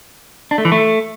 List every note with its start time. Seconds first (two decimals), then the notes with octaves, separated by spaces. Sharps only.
0.51 D4
0.58 A3
0.65 E3
0.72 A3